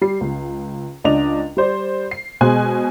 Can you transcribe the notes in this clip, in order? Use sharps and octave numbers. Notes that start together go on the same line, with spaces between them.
G3 C7
C#2
C#2 D4 D#5 F7
G3 C5 D5
C7
B2 G#3 C5 G#5 F#6